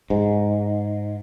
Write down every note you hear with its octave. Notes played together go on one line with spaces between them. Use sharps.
G#2